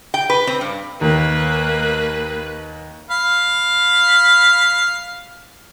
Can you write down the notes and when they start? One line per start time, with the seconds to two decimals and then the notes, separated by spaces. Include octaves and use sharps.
0.14 G5
0.30 B4
0.47 C4
0.61 G2
1.01 D#2 A#3 B4
3.10 F5 B5